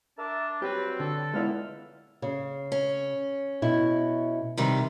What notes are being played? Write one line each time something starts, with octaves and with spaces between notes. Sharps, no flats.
D4 A#4 E5 A5
F#3 G3 C4 G4 B4
D3 A4
C#2 A#2 G#3 B3 E4 F6
C#3
C#4
B2 E4
C3 D#3 G3